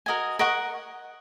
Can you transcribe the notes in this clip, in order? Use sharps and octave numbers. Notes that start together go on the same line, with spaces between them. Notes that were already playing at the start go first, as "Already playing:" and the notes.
F#4 A#4 D#5 G#5
A#4 D#5 F#5 C#6